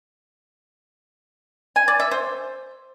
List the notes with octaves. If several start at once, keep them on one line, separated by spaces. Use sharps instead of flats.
G#5
D5
E5
C5